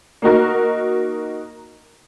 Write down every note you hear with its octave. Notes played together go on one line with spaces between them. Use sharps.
A#3 D#4 F#4 A#4